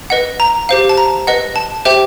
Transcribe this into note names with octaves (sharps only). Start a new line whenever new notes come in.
B4 D#5 F#5
A#5
G4 C5 F5
A5
A#5
B4 D#5 F#5
A5
G4 C5 E5 G5